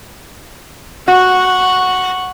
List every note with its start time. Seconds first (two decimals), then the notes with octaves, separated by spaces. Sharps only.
1.08 F#4 F#5 C#6